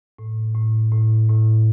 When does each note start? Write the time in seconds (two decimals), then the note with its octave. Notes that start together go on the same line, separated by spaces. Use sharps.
0.19 A2
0.55 A2
0.92 A2
1.29 A2